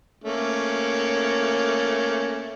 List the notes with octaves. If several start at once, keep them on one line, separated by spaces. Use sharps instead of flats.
A3 A#3 C#4